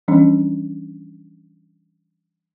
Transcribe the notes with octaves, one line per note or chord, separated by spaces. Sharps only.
E3 F3 G3 B3 C#4 D4